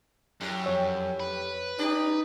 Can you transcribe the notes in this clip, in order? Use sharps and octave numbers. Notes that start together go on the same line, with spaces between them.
F#2 A2 G3
F2 C#5 E6
B4
C#4 D#4 G4 D5